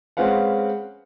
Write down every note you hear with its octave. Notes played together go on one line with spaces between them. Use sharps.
G#3 C4 C#4 B4 F5 F#5